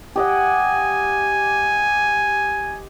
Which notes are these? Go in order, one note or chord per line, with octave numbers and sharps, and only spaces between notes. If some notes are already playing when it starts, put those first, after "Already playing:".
G4 D#5 F#5 G#5